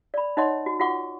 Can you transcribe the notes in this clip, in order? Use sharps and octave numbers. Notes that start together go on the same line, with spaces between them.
D5 B5
D#4 C#5 D#5 F#5 C6
F#4
F4 F#4 F#5 C#6 D6